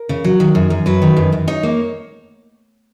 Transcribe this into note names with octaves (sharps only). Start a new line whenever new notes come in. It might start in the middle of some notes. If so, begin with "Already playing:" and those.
Already playing: A#4
C#3
F#3
D#3
F#2
F#2
F#3 B4
D#3
F#2
F#2
D#4 C#5
A#3